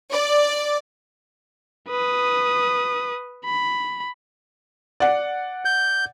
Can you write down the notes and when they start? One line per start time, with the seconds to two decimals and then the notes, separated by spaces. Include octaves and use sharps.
0.12 D5
1.89 B4 D#6
3.45 B5
5.00 D5 F#5
5.65 G6